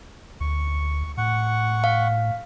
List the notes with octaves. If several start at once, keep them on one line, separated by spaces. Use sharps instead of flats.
D2 C#6
A2 F#5 C#6
F5